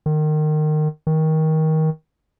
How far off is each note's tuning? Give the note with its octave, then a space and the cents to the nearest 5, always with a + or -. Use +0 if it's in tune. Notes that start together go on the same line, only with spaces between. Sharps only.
D#3 -25
D#3 +20